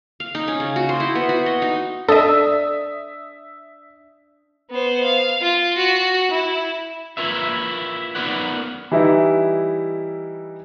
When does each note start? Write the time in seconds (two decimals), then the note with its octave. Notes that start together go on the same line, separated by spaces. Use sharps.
0.20 F5
0.35 D#4
0.48 C#4
0.60 C#3
0.76 F#4
0.89 C5
1.00 E4
1.15 B3
1.29 F#4
1.46 D#5
1.62 D#4
2.08 D4 A4 D#5 E5 D#6 E6
4.70 B3 C5
5.04 F5
5.41 F4
5.77 F#4
6.31 E4
7.17 E4 F4 A#4 B4 E5
8.15 B3 D#4 A#4 B4 D5 F#5
8.92 E3 G3 D#4 E4